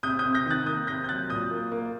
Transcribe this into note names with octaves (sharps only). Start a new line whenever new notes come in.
C3 D#6 G6
D#6 G6
C3
G6 A#6
D#3 F#6 A6
A#3 D#6 G6
C3 G6 A#6
G6
F#3 F#6 A6
A#2 D#6 G6
A#3
A#3